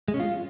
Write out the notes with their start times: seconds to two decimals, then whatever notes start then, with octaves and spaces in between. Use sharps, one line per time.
0.08 G#3
0.14 C#4
0.20 F4